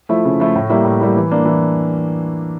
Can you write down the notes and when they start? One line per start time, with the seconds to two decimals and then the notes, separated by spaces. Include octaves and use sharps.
0.09 F3 A3 E4
0.25 C#3
0.40 F3 A3 E4
0.55 A2
0.70 G3 A#3 E4
0.85 A2
1.01 G3 A#3 E4
1.16 E3
1.31 A#3 D4
1.45 E3